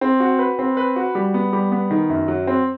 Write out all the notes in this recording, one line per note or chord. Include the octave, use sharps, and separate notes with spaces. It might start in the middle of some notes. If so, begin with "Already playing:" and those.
C4
F#4
B4
C4
B4
F#4
G3
B3
G3
B3
D#3
F#2
F#3
C4